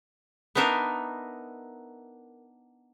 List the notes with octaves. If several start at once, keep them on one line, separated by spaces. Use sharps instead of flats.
B3 D4 D#4 A#4 E5